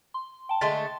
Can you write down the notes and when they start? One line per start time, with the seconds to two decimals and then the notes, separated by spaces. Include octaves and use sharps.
0.14 C6
0.49 G5 A5
0.61 D3 G#3 A3 A5 C6 A6